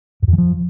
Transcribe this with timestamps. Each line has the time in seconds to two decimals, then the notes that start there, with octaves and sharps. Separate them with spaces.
0.22 F#2
0.28 F2
0.33 E3
0.38 F3